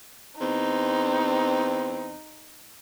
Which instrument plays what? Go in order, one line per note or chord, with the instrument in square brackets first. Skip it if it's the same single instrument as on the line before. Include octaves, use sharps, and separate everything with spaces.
[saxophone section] E2 C4 [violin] D#4